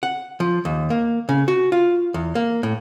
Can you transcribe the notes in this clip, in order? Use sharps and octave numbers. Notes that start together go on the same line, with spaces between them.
F#5
F3
D#2
A#3
C#3
F#4
F4
E2
A#3
A2